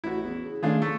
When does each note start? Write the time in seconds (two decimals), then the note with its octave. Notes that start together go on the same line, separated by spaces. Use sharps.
0.04 A1 E4 F#4
0.24 E2
0.45 C#3
0.63 D#3 A3 C#4 D4 F4 G#4
0.82 A3 C#6